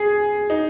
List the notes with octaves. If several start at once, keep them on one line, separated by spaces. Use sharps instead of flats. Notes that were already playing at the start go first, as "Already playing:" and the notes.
Already playing: G#4 G#5
D#4